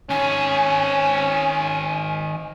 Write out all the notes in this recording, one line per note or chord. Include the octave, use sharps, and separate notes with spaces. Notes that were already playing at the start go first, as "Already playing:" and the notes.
D#3 C#4 G#4 G#5